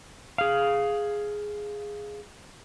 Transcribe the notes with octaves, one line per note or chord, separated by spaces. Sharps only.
G#4 F5